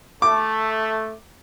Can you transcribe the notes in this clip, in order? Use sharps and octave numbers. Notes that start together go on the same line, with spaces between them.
A3 D6